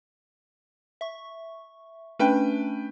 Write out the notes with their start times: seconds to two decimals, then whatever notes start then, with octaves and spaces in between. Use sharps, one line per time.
1.01 E5 C#6
2.19 A3 C#4 D4 B4 G5